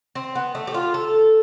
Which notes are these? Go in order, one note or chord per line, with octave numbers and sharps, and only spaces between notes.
C4
B3
A3
G4
F4
A4